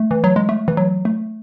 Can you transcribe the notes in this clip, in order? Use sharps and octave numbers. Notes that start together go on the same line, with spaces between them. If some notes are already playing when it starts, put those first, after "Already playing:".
Already playing: A3
E3
F#3
G#3
A3
E3
F#3
A3